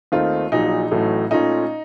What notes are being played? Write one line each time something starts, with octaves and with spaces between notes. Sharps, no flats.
D#2 D#3 A3 C4 D#4 F4
A#1 A#2 F#3 D#4
A1 A2 F#3 A3
A#2 A3 C#4 D#4 F4